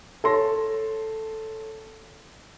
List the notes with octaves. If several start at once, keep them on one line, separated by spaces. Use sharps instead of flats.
A4 C#5 A5 C6 A#6